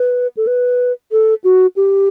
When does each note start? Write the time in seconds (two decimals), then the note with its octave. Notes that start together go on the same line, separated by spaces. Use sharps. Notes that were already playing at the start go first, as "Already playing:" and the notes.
Already playing: B4
0.37 A4
0.47 B4
1.11 A4
1.44 F#4
1.76 G4